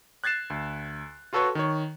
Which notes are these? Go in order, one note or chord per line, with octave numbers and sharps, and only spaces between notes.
F#6 G#6 A6 C7 E7
D2
F4 F#4 A4 B4 C#5
D#3 C#5